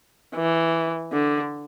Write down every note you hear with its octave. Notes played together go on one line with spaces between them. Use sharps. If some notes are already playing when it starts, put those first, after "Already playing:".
E3
D3